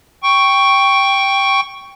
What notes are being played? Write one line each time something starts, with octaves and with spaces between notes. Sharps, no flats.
G5 C#6